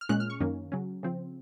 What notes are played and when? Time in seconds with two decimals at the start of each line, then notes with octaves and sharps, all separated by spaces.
0.01 F6
0.09 A#2 G#3 C#4 F#6
0.20 F6
0.30 C#6
0.40 F#2 D#3 A#3 C#4
0.72 C#3 F#3 C#4
1.03 C#3 F3 C4